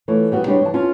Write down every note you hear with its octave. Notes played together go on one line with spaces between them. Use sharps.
E3 A3 F4 C#5
G3 B3 F#4
G3 G#3 D4 G4 C#5
E3 A5
C#4 F4